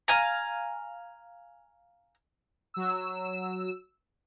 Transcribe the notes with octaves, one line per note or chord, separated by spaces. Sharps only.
F5 G#5 A#5
F#3 E6